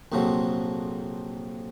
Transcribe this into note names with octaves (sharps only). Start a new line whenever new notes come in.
A#1 F2 C3 F3 F#3